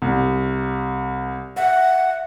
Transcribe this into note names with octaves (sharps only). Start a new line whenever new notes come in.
C2
E5 F#5